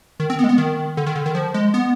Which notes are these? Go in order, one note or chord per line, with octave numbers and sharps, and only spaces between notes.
D#3
C4
B3
G#3
B3
D#3
D3
D#3
D3
D#3
F3
G#3
B3